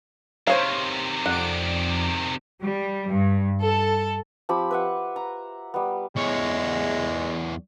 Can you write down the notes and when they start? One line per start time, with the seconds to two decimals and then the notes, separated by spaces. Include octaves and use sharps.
0.47 C3 D#3 C5 C#5 F5
1.26 F2 D5 F#5 D7
2.62 G3
3.11 G2
3.62 A4
4.49 F3 C4 G4 B5
4.71 B4 E5 F#5
5.16 A#5
5.74 G3 B3
6.16 E2 G#3 C#5